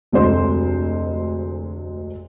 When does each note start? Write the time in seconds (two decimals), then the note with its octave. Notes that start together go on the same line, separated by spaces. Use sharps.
0.12 F1 D2 G#3 C5 C6